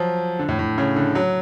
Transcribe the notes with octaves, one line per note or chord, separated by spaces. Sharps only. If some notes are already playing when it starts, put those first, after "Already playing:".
Already playing: F3 F#3
D3
A2
A2
C#3
D3
F#3